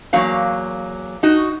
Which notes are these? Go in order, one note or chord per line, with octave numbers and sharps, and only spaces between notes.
E2 F#3 A#3 F5
D#4 F#4